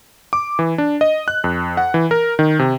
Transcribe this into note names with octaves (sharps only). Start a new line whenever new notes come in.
D6
E3
D4
D#5
F#6
F2
F#5
E3
A#4
D#3
C3